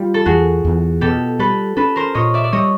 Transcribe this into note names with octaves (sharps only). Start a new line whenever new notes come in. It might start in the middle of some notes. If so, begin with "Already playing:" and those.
Already playing: G3 F4 G4
A4
E2 F#4 G#4
E2
B2 G4 A4
G3 A4 B4
C#4 A4 B4
A#4 C5
A#2 C#5 D#5
D5 E5
D5
G3 C#5 D#5